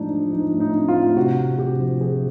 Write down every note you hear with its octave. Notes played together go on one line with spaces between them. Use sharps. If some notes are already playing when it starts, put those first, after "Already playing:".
Already playing: A2 F3 G#3 D4 D#4
F3
F3 D#4
A2
D#4
C4
F4
A2
C3 F#4
C3
C3 G4
F3
F3 G#4